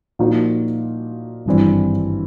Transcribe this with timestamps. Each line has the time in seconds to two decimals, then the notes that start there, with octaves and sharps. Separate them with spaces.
0.19 A#2 F3 A#3 D#4 F#4
1.45 G#1 G2 E3 G3 C4